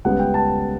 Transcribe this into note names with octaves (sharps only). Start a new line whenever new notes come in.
C#2 C#3 G3 B3 F#5
G5
A5